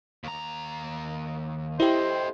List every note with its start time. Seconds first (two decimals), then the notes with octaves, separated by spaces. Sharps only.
0.24 D#2 A#5
1.80 E4 G4 A4 C5 D#5